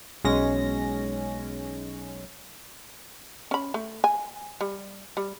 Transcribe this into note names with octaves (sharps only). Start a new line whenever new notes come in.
B1 G#3 C#4 A#6
C#4 B5
A3
G#5
G3
G3